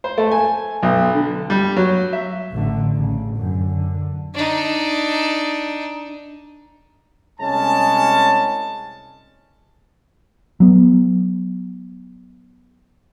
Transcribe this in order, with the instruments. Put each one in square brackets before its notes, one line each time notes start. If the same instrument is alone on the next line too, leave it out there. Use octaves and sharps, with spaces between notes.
[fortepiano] C5
A3
G#5
B1
D3
G3
F#3
E5
[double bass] A1 D3
A1 C#3
F#2 D3
D3
[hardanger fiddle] D4 D#4
[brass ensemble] C2 G#3 C#4 A5
[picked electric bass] F#3 B3